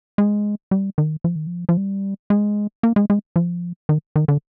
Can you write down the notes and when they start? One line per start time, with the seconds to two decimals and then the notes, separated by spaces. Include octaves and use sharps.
0.18 G#3
0.71 G3
0.98 D#3
1.24 F3
1.36 D#3
1.47 F3
1.69 F3
1.77 G3
2.30 G#3
2.83 A#3
2.96 G#3
3.10 G#3
3.36 F3
3.89 D#3
4.16 D#3
4.28 D3